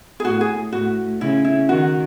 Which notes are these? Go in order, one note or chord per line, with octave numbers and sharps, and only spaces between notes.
G#4
A2 F#4
G#4
A2 F#4
C#3 E4
E4
D#3 F#4